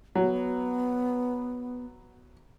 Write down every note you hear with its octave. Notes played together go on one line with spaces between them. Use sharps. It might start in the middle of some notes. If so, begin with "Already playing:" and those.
F#3 B3